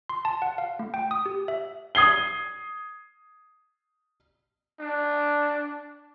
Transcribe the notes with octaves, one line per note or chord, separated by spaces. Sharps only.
C6
A5
F#5
F5
A3
G5
D#6
G4
E5
D#6 G#6 C7 G7
D4